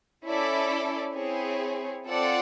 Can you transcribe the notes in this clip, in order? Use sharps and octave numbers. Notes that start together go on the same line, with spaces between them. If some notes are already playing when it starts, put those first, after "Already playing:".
C#4 E4 A4 D5
C4 E4 G#4 C#5
C4 F4 A4 D5 F#5